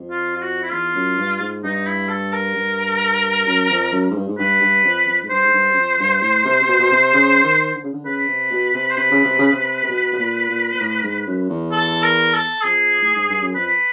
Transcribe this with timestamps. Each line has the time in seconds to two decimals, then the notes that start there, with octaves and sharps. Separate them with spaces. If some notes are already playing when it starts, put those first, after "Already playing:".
Already playing: F2
0.11 F4
0.35 F4
0.41 F#4
0.62 E4
0.72 E2 F4
0.95 F#2
1.18 G2
1.40 G#2
1.63 G2 D#4
1.86 E4
2.09 A4
2.32 A#4
2.55 G2
3.47 F#2
3.70 F2
3.92 F#2
4.10 G#2
4.16 G2
4.28 G#2
4.38 G2 B4
4.62 G2
4.84 F2
5.07 F2
5.23 G#2
5.30 G2 C5
5.45 G#2
5.53 G2
5.72 F#2
5.77 F2
5.99 G2
6.21 A2
6.45 C3
6.62 C3
6.68 B2
6.80 B2
6.91 C3
7.14 C#3
7.44 D#3
7.75 D3
7.84 C#3
7.93 D3
8.05 C#3 B4
8.28 C3
8.51 B2
8.74 C3
8.90 C5
8.97 C3 B4
9.11 C#3
9.25 C3
9.39 C#3
9.52 C3
9.84 C3
9.89 B2
10.13 B2
10.19 A#2
10.50 A#2
10.73 A#2
10.80 A2
11.03 G#2
11.27 F#2
11.49 E2
11.72 A4
12.03 A#4
12.33 A4
12.64 F2 G#4
13.02 A2
13.15 G#2
13.29 G2
13.42 F#2
13.55 F2 B4